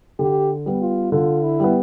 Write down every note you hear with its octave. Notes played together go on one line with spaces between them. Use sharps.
D3 G4
G3 B3
F4
D3 F4
E4
G3 B3